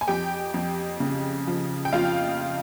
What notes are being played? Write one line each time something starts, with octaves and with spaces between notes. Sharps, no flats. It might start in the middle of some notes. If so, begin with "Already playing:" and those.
G#5
F2 G4 G5
F2
C#3
F3
G5
F2 F4 F5